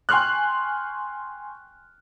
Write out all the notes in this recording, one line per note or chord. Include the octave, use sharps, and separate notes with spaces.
G5 G#5 C6 C#6 F6 F#6